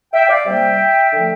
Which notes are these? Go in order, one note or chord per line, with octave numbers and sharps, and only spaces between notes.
E5 G5
G5
D5 F5
C3 G3 A#3 D4 E5 G5
D3 F3 A3